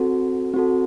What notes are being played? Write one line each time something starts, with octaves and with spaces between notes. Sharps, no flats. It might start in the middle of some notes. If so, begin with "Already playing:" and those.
Already playing: C4 F#4 A4
C4 F#4 A4